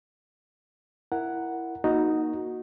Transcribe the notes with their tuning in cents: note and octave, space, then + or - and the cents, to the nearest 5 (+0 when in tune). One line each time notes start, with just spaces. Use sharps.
E4 +10 A#4 +0 F#5 +0
A#3 +20 D#4 +0 F#4 -15